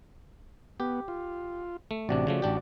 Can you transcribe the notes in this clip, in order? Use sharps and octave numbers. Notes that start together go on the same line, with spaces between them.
B3 G4
F4
A3
A1 C3 D4 F#4 D5
C#3 F3 A3
A1 D4 G4